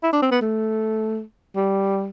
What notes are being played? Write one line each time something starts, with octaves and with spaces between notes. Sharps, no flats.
E4
D4
C4
B3
A3
G3